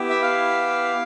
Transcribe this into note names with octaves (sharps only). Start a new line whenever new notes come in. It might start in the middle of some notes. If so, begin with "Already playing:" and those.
Already playing: B3 E4 G4
E5
F5